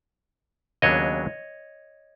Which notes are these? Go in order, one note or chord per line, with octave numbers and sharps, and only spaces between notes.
D#2 C#3 F#3 B3 D4 C#5 D#5